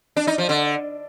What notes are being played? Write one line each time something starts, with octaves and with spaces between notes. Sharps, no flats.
D4
D#4
F3
D3